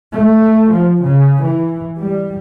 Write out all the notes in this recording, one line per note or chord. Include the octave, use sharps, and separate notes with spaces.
A3
F3
C#3
E3
G3